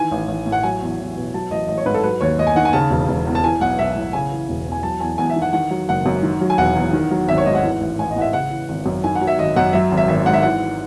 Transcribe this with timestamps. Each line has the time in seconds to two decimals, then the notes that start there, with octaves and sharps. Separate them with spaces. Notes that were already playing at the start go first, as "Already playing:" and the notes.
Already playing: D#3 E3 G#5
0.12 A1
0.28 A1
0.46 A2
0.52 F#5
0.63 F#3 G#5
0.82 E2
0.99 E2
1.17 B2
1.34 F#3 A5
1.51 A1 D#5
1.68 A1 D#5
1.78 C#5
1.86 G#2 B4
1.94 A4
2.03 F#3 B4
2.21 D#2 C#5
2.38 D#2 D#5
2.47 G#5
2.56 D#3 F#5
2.65 G#5
2.73 C#3 A5
2.91 E1
3.08 E1
3.27 E2
3.35 A5
3.44 E3 G#5
3.61 B1 F#5
3.79 B1 E5
3.96 A2
4.13 C#3 G#5
4.32 E3
4.49 E1
4.66 E2
4.72 G#5
4.83 F#3 A5
5.01 E2 G#5
5.18 E2 G#5
5.30 E5
5.36 D#3
5.42 F#5
5.53 D#3 F#5
5.71 F#3
5.89 F#1 F#5
6.06 F#2
6.23 D#3
6.41 F#3
6.50 G#5
6.58 E1 F#5
6.77 E2
6.93 D#3
7.11 F#3
7.28 G#1 E5
7.38 C#5
7.46 G#2 D#5
7.55 F#5
7.63 E3
7.81 A1
7.99 A1 G#5
8.11 D#5
8.16 A2 F#5
8.21 E5
8.33 C#3 F#5
8.51 E3
8.69 G#1
8.86 F#2
9.04 D#3 G#5
9.15 F#5
9.21 F#3
9.27 E5
9.39 G#1 D#5
9.56 F#2 F#5
9.73 F#3 E5
9.92 G#1
9.97 E5
10.08 G#1 E5
10.26 G#2 F#5
10.33 E5
10.42 E3 F#5